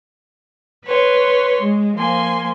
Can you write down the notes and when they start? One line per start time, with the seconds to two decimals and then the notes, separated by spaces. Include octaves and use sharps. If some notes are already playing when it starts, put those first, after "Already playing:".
0.85 B4 C#5 C6
1.60 G#3
1.95 F3 A#3 G#5 C6